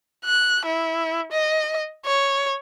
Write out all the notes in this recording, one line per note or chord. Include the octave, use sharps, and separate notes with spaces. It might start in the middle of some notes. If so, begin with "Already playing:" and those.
F#6
E4
D#5
C#5